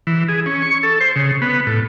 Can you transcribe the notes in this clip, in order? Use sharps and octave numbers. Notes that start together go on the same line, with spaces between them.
E3
G#4
C#4
C#6
A4
C5
C#3
B3
A2